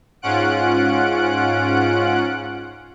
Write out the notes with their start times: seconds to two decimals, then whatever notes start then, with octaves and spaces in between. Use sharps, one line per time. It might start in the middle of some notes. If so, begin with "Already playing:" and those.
0.22 G#2 C#4 F4 F#5 F#6 D7